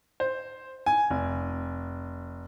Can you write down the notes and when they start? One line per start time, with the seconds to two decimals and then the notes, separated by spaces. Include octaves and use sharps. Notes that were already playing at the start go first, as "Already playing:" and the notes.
0.20 C5
0.86 G#5
1.10 F1